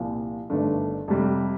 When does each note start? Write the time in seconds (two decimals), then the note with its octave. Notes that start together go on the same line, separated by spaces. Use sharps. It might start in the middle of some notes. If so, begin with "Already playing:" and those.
Already playing: C2 A#2 F3
0.50 G1 G2 D#3 A3 D4
1.08 F2 C3 G3